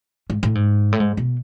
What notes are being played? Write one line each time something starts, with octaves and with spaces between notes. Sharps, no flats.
G#2
A2
G#2
A2
G#2
B2